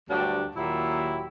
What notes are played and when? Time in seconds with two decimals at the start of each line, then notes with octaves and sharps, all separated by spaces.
0.10 D2 G2 F#3 D4 G4
0.55 D#2 A#2 F#3 E4 G4 E5